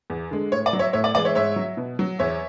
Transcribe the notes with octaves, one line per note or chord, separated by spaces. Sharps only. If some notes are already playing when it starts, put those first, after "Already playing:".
E2
D3 G#3
A2 C#5
D5
F#3
C#5 E5
A2 C#5 E5
D5
E3 G#3 D5
C#5 E5
G#2 C#5 E5
F#3
B2
F#3
E2 C#5 E5